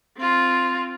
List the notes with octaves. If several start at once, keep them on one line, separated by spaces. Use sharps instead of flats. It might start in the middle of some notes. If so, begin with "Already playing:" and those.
C4 F4